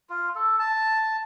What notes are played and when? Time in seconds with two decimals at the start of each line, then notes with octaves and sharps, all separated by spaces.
0.10 F4
0.36 A4
0.59 A5